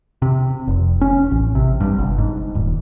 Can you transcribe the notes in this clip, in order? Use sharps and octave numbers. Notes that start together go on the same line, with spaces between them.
C3
F1
C#4
A1
C3
G2
G1
G#2
D#1